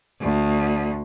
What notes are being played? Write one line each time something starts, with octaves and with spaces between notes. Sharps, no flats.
D2